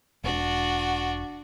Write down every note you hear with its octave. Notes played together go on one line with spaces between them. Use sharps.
E1 D4 F#4